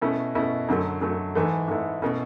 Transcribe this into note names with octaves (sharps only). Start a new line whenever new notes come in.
B2 A3 C#4 E4
B2 A3 C#4 E4
F#2 D3 F#3 A3
F#2 D3 F#3 A3
G#2 E3 A3 E4
G#2 E3 A3 E4
B2 A3 C#4 E4